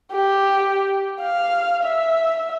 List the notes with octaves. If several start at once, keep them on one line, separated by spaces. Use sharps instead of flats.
G4
F5
E5